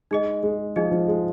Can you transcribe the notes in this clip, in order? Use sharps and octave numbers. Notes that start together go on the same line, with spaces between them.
G#3 D#4 G#4 D#5
G#3
F3 D#4 G#4 D#5
F3
G#3